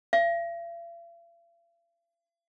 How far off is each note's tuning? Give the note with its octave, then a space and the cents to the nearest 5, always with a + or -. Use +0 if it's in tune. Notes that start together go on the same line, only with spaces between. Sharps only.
F5 -45